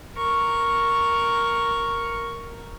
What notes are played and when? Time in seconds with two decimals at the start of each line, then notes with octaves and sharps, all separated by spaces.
0.16 A#4 C#6